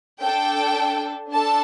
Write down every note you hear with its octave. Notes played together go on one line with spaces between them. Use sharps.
D4 A4 G5
D4 A4 A5